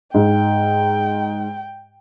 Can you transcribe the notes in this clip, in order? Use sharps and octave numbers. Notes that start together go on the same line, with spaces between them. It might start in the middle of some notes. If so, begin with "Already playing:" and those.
G#2 G5